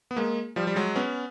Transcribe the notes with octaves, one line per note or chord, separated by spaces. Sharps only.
B3
G#3 A#3
F3 G3
G3
F#3 G#3
B3 C#4